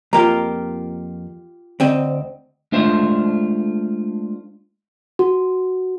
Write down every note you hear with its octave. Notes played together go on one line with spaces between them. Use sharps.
F2 A#3 F4 G4 A#5
D2 C4 D#5
G#3 A3 D4 F4 C5 E5
F#4